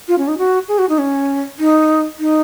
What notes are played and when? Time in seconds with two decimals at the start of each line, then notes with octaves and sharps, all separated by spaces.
0.08 F4
0.18 C#4
0.28 D#4
0.38 F#4
0.68 G#4
0.79 F#4
0.89 D#4
0.99 C#4
1.59 D#4
2.19 D#4